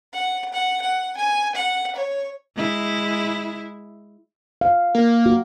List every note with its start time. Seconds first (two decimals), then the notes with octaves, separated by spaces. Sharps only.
0.13 F#5
0.53 F#5
0.81 F#5
1.17 G#5
1.55 F#5
1.95 C#5
2.57 G#3 E4
4.61 F5
4.95 A#3
5.26 F#4